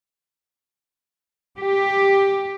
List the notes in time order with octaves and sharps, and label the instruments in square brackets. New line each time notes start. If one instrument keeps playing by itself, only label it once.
[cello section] G4